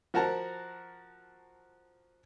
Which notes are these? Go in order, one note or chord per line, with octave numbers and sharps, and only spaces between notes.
F3 F#4 A#4 A5 A#5